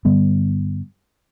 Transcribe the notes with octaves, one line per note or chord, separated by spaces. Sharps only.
G2 D3 G3 B3